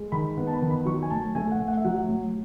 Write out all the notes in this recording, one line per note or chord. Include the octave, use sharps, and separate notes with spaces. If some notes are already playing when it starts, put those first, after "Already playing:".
Already playing: G#3
D#3 B5
B3
A5
B5
D#3
B5
F#3 C#6
G#5
A2 A5
A3 G#5
F#5
A2
F#5
E5
F#3 F#5
A2